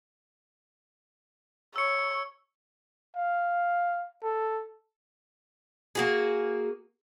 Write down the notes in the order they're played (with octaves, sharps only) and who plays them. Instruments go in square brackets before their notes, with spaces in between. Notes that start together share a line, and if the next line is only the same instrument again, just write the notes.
[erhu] C#5 [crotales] E6 C#7
[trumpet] F5
A4
[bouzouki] A#3 F#4 G#4